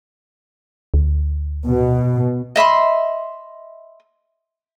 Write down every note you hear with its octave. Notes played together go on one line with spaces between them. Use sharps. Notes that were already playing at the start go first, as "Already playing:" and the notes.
D2
B2
D#5 E5 B5 C6